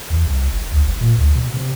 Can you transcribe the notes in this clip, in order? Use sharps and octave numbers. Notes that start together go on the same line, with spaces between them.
E2
C2
G1
D2
G1
A#2
D2
B2
C3